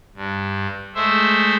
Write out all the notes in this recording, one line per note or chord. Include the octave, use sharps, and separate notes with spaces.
G2
G#3 A3 C5 E5